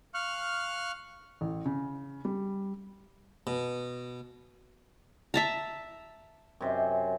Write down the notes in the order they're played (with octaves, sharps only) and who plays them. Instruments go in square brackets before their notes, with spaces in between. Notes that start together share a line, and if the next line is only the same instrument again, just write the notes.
[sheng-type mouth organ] F5 C#6 F6 F#6
[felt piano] A1
C#3
G3
[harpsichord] B2
[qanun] E5 A5 A#5
[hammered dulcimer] F#2 C3 C5